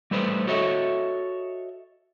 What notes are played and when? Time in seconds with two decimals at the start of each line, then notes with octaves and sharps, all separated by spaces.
0.11 G3 A3 B4 C5
0.47 F#4 A4 C#5 D#5 E5